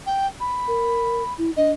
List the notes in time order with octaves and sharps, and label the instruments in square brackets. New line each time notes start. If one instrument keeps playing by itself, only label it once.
[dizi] G5
B5
[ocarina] A#4
E4
[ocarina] D4 [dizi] D#5